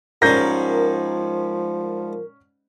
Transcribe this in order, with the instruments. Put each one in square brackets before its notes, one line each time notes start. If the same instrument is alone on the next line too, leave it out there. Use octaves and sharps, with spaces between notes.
[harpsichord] G#2 G3 [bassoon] F3 [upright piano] C#4 G6 A#6 [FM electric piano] A#4